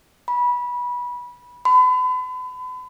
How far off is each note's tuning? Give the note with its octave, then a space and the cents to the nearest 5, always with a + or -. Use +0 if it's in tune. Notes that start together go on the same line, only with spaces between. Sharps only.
B5 -20
B5 +40